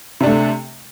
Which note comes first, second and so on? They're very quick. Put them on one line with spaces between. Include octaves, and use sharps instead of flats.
C3 D4 A3